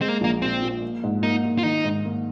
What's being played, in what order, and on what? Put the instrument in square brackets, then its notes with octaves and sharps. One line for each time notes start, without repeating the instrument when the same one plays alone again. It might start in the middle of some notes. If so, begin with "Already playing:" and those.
[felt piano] G#3 [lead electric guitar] C4
[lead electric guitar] A#3
[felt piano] A#1 [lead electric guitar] A#3
[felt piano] A#2 [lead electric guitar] C4
[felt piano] A#2
A#3
G#2
[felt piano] A#3 [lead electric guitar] D#4
[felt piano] A#3
[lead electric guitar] F4
[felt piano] D#3 [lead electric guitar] D#4
[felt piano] G#2
A#3